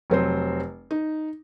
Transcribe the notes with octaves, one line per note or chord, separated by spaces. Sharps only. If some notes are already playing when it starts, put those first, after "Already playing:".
F1 F#3 C4 C5
D#4